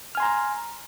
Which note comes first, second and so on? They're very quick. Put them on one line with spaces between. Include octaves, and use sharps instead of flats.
F6 G#5 C6 A#5